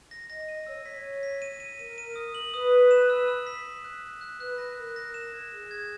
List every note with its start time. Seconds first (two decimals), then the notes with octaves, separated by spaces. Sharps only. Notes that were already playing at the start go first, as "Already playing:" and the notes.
0.11 A#6
0.30 D#5 A#6
0.48 D#7
0.66 C#5 E6
0.75 D#5
0.81 C#5 B6
1.04 D#7
1.23 B6
1.42 D#7
1.60 D#7
1.79 A#4 D#7
1.98 D#7
2.16 D#6
2.35 F#7
2.54 B4 D#6
2.71 F#7
2.91 E7
3.10 E6
3.28 E6
3.47 B6
3.65 B6
3.84 F#6
4.03 B6
4.21 F#6
4.40 B4 F#6
4.58 A#6
4.77 A#4 F#6
4.96 A#6
5.14 E7
5.34 G#6
5.52 G#4 E7
5.71 G#6